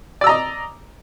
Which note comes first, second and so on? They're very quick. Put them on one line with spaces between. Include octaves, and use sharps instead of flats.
D5 E6 A#5 D#5